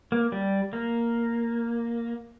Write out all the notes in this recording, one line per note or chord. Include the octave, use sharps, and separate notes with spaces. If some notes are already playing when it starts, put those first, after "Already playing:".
A#3
G3
A#3